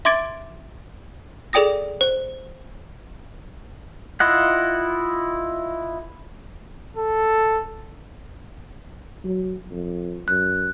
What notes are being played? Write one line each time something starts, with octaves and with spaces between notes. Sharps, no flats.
E5 C6 D6 G#6 A6 D7
G#4 A4 D5 G5 D#6 A#6
C5
E4 F4 D#5 F#5
A4
F#3
F2
F#2 F#6